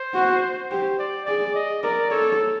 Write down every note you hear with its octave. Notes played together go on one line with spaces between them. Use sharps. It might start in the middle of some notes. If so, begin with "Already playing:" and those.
Already playing: C5
F#4
G4 C5
D5
G#4 D5
D#5
A#4 D5
A4 C#5